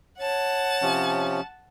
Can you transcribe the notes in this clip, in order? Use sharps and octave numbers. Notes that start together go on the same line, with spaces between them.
C#5 F#5 A5
C3 F3 C#4